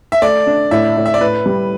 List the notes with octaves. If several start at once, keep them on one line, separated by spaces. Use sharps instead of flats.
E5
A3 D5
D4
A2 E5
A2
E5
D5
A2 B4
G3